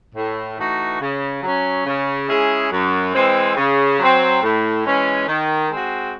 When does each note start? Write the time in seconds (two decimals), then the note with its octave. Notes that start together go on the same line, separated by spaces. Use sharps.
0.15 A2
0.58 E3 A3 D#4 F#4
1.00 C#3
1.43 F#3 C#4
1.86 C#3
2.29 G#3 C#4 E4 G#4
2.72 F#2
3.15 E3 G#3 C4
3.57 C#3
3.99 F#3 C4
4.42 A2
4.85 E3 G#3 C#4
5.27 D#3
5.70 G#3 C4 F#4